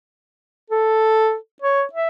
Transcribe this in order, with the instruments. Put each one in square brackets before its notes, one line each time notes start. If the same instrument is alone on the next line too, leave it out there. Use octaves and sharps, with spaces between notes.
[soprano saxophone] A4
C#5
E5